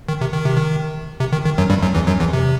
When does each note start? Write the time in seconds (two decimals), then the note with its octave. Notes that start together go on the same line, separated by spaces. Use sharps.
0.09 D#3
0.21 C3
0.33 D#3
0.45 C3
0.57 D#3
1.20 C3
1.32 D#3
1.45 D#3
1.58 F#2 F#3
1.70 G2 G3
1.83 F#2 F#3
1.95 E2 E3
2.07 F#2 F#3
2.20 E2 E3
2.33 C3